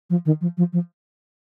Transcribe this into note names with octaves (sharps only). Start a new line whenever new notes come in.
F3
D#3
F3
F3
F3